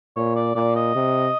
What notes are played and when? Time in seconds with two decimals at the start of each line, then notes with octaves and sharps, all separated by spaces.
0.16 A#2 C#5
0.36 D5
0.55 A#2 D5
0.76 D#5
0.95 C3